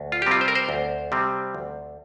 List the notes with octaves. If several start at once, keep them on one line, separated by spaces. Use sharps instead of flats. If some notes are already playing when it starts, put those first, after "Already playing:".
Already playing: D2
F4
G4
C3 G3 C4 F4
C5
A#4
C5
D2
C3 G3 C4
D2